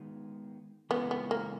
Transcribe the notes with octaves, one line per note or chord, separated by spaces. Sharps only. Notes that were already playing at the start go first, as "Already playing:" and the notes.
Already playing: D#3 G#3 B3
C#3 E3 G#3 B3 C#4 F4
B3
A#3